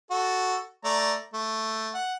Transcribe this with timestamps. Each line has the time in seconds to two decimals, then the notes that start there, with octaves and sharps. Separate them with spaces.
0.11 F#4 A4
0.84 A3 D5 A#5
1.34 A3
1.94 F#5